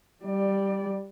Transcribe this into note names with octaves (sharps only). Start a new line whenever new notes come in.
G3 D5